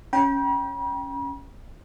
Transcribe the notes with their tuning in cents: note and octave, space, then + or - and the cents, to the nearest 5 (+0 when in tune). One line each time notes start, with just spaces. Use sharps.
C#4 +0 G5 +0 B5 -45